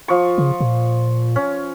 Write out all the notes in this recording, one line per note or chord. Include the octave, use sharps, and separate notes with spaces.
F3 C#6
C#3
A#2
C#4